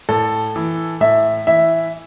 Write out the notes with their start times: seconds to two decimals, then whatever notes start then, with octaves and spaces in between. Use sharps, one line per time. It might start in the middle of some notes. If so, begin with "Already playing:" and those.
0.09 A2 A4
0.56 E3
1.01 A2 E5
1.47 E3 E5